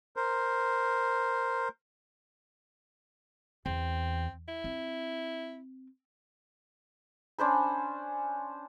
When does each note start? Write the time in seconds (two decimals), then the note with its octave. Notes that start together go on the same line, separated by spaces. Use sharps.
0.16 A#4 C5
3.66 E2 C4
4.48 E4
4.64 C4
7.38 C#4 D4 C5 B5